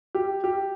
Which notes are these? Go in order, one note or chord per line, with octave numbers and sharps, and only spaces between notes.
G4
G4